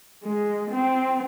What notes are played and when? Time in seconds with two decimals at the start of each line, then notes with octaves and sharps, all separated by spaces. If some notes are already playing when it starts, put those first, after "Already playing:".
0.24 G#3
0.71 C4